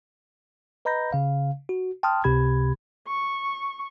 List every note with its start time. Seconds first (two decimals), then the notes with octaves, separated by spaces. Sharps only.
0.85 B4 D#5 A#5 B5 G6 A#6
1.13 C#3 F5
1.69 F#4
2.03 G5 A5 C6 D#6 F6
2.24 C#2 C3 G4 B5 G#6
3.07 C#6